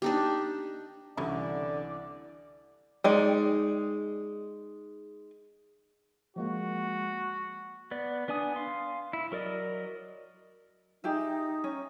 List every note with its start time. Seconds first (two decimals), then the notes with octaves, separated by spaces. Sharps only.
0.02 D4 D#4 G4
1.17 C2 D3 E3 G3 C#4 E4 D5
3.04 G#3 D#4 D5
6.36 F3 G#3 A#3 F#4
7.91 B3 D5
8.28 B3 D4 D5 G#5 D#6
8.56 F5 C6
9.13 E4
9.32 F#3 A#4 D5 D#5
11.04 D#4 G4 G#4 E5
11.64 C#4